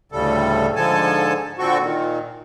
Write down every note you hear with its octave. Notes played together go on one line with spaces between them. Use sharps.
D2 A2 C#3 G3 A4
G#2 D3 F3 A4 G#5 A5
A#2 D3 C4 F#4 A4 C#6
A#2 D#3